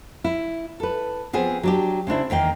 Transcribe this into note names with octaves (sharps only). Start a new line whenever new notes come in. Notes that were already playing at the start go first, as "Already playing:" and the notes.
E4
A4 B4
F3 B3 C4 G#4
F#3 D4 G4
C#3 C4 D4 E4
E2 D#3 A#3 G5